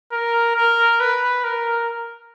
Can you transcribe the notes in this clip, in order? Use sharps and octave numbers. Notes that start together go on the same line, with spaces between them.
A#4
A#4
B4
A#4